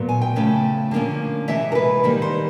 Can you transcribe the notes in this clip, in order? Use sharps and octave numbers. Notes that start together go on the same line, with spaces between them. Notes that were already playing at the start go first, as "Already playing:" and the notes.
Already playing: A#2 F#3 B3
G#5
G5
C#3 F3 A3 C#4
D3 F3 A#3 C#4
C3 E3 G#3 E5
A#4
B4
D#3 G3 A#3 B4
C5